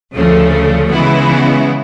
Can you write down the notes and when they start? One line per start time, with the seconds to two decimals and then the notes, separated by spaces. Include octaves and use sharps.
0.14 D2 C#3 F3 A3
0.91 C#3 E3 G#3 B3 E4